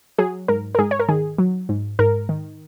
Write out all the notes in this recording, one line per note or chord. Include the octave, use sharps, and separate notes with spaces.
F#3 G#4
G#2 A#4
A#4
G#2 G#4
C#5
A#4
D#3 G#4
F#3
G#2
G#2 A#4
D#3